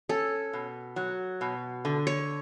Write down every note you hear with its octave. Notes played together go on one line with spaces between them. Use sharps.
C#4 A4
B2
F#3
B2
D3
C#5